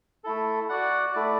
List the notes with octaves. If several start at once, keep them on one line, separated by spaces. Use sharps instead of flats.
A3 E4 A4
F#4 D5 F#5
A3 E4 D5